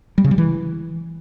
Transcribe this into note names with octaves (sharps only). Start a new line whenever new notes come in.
G3
C#3
G3
E3